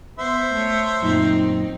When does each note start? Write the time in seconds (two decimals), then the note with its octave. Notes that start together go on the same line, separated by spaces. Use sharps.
0.19 B3 C5 E5
0.53 A3 C#5
1.02 F#2 A#2 D#3 C4 D#4